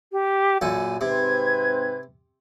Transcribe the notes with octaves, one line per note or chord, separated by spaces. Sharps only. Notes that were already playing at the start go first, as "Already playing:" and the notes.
G4
A#1 F#2 A4 G#5
G#2 C3 C4 B4 G#6